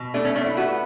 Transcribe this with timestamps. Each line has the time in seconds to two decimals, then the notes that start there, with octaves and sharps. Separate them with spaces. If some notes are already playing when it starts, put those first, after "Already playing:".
Already playing: B2
0.14 A3 D4
0.25 C#4
0.35 A3 D4
0.46 E4
0.57 B3 F#4